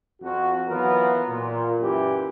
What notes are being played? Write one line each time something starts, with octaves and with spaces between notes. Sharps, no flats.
F2 F#4
E3 F#3 B3 F4 A#4
A#2
F#2 A#2 E3 E4 G4